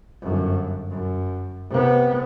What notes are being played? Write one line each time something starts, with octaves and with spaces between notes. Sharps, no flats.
G1 F#2
F#2
C3 B3